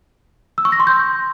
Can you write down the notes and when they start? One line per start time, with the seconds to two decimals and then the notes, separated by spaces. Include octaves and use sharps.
0.58 E6
0.65 C#6
0.72 A#6
0.80 C6
0.87 G6